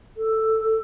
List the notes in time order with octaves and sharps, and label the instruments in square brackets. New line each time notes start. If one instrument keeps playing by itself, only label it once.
[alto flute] A4